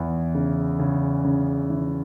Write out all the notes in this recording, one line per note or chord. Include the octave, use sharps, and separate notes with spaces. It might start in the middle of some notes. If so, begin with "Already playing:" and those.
Already playing: E2 E3
C#3
C#3
C#3
E3